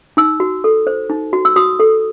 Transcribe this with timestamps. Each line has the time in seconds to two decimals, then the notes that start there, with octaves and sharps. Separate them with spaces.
0.17 D#4 E6
0.40 F#4
0.64 A4
0.87 C5
1.10 D#4
1.33 F#4
1.45 E6
1.56 F#4 D#6
1.80 A4